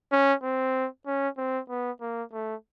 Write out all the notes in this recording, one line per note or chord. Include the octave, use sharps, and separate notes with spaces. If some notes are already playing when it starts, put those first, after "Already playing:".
C#4
C4
C#4
C4
B3
A#3
A3